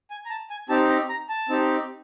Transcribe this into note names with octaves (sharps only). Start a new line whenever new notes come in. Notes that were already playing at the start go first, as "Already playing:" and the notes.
G#5
A#5
A5
G#5
C4 D#4 G4 A5
A#5
A#5
A5
C4 D#4 G4